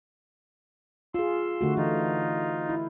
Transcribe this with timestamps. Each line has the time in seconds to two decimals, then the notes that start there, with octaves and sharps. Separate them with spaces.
1.14 F4 G#4 C6 E6
1.61 D3 A3 F#4
1.77 E3 D#4 F4
2.69 E4